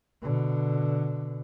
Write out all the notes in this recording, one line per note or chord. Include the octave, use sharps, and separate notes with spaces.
B2 D3